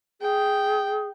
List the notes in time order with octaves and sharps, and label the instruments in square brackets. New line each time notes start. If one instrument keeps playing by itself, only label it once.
[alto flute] G#4 [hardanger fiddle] G5